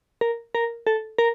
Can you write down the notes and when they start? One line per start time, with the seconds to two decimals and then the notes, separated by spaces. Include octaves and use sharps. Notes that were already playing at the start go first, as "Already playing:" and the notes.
0.21 A#4
0.55 A#4
0.87 A4
1.18 A#4